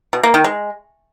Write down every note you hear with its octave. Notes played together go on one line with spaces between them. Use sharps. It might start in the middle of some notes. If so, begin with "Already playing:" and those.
B2
A#3
D#3
G#3